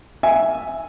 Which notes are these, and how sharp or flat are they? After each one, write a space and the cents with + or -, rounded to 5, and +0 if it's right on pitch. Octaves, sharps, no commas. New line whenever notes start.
E5 +0 G#5 +0